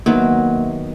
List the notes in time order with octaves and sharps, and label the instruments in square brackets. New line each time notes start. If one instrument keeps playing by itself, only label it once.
[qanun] D#3 F#3 B3 [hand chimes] A#3